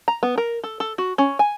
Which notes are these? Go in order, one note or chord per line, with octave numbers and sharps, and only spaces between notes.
A#5
B3
A#4
A4
A4
F#4
C#4
G#5